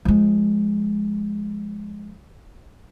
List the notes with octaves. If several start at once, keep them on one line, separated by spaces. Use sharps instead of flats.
F3 G#3